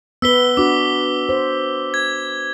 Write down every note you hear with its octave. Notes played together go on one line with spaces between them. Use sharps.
B3 B4 E6 B6 G7
D4 F#4 D6
C5
G#6